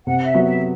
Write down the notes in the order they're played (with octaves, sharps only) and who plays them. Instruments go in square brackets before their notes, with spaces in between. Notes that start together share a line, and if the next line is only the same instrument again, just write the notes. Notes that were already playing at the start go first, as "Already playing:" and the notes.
[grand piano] C3 [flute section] F#5
[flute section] E5
[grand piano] F#3 B3 F#4
[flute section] E5